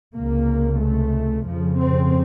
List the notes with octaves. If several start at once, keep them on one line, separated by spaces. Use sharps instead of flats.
C#2 C3 A#3
A3
F2 C#3 F3
C4